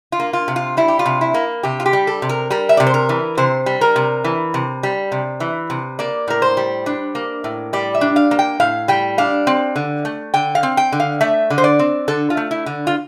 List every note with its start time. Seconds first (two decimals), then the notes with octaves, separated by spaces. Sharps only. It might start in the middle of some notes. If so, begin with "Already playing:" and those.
0.12 F4
0.20 A#3
0.33 F4
0.48 C3
0.56 F4
0.77 G3 E4
0.88 G4
0.99 F4
1.06 C3
1.21 E4
1.34 A#3
1.63 C3 G4
1.80 F4
1.86 G4
1.93 G3
2.07 A4
2.22 C3
2.29 A#4
2.50 G3 A#4
2.69 E5
2.77 C3 D5
2.87 C5
2.94 A#4
3.09 E3
3.37 C3 C5
3.66 G3
3.81 A#4
3.96 C3
4.24 E3
4.54 C3
4.83 G3
5.12 C3
5.40 E3
5.70 C3
5.99 A#3 D5
6.28 A2 A#4
6.42 C5
6.57 G3
6.86 D4
7.15 A#3
7.44 A2
7.73 G3 D5
7.94 E5
8.01 D4
8.16 F5
8.31 A#3
8.39 G5
8.60 A2 F5
8.88 G3 G5
9.18 D4 F5
9.47 C4
9.76 D3
10.05 A3
10.34 D3 G5
10.55 F5
10.63 C4
10.77 G5
10.92 D3
11.00 F5
11.21 A3 E5
11.50 D3
11.58 C5
11.64 D5
11.79 C4
12.08 D3 A4
12.30 F4
12.37 A3
12.51 E4
12.66 D3
12.87 F4